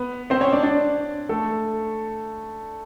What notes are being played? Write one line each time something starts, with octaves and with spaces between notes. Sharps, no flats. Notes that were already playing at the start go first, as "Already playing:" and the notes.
Already playing: B3 B4
C4 C5
C#4 C#5
D4 D5
D4 D5
A3 A4